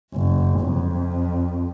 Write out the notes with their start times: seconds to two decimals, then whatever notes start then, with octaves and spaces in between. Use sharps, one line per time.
0.14 F#1
0.61 F2